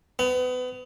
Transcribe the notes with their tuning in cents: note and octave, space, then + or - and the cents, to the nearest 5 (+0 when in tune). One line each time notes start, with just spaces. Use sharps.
B3 +30